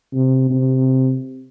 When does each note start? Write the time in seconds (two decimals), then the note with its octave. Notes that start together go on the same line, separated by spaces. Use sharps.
0.14 C3
0.50 C3